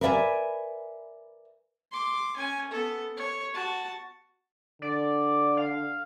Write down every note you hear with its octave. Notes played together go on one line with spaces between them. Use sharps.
A#4 B4 D5 E5 G5 G#5
C6 D6
C#4 G#5
B3 A4
C#5
F#4 A5
D3 D5
F5